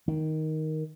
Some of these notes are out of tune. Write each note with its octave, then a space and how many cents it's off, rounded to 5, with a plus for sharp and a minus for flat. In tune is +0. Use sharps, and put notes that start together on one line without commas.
D#3 +5